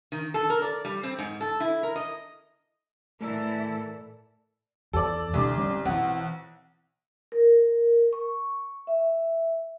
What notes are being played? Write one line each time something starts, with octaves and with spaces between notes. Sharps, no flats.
D#3
A4
A#4
D5
G3
C4
G#2
A4
E4
A#4
D#5
A2 E3 A3 E4 A4 A#4 D5
E2 A4 D5
E1 C2 D3 D6
G3 C4 C#4
B1 E3 C4 F#5
A#4
C#6
E5